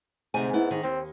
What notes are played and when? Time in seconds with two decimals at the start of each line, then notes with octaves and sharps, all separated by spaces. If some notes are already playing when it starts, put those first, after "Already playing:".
0.34 D2 G#2 C3 G#5
0.53 B3 E4
0.71 G#2 D#3
0.83 D#2 C4